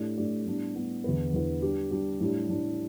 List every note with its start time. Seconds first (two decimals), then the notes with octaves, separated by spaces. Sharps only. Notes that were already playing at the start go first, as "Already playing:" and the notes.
Already playing: A2 A3 D4 G4 D5
0.17 A2 A3 D4 G4 D5
0.46 A2 G3 B3 D4
0.75 A2 G3 B3 D4
1.04 E2 D3 B3 E4 B4
1.33 E2 D3 B3 E4 B4
1.62 G3 D4 G4
1.91 G3 D4 G4
2.20 A2 G3 D4
2.49 A2 G3 D4